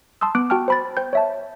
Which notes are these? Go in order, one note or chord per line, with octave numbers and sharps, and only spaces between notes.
A5 C6 D#6 E6
B3 D6 F#6 D7
F#4 G5 A5 F6
C5 B5 A6
C5 G5 G6
C#5 E5 A5